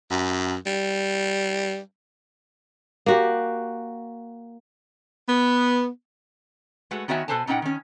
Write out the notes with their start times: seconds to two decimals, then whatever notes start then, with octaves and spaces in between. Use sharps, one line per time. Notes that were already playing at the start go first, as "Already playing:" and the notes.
0.11 F#2
0.66 G3
3.06 A#3 F#4 G4
5.28 B3
6.91 G#3 A3 F#4 B4
7.08 D#3 B3 F#4 C#5 E5 G#5
7.28 B2 A4 B4 C5 G#5 A5
7.47 A#2 C#4 D#4 B4 F#5 G5
7.62 D#3 C#4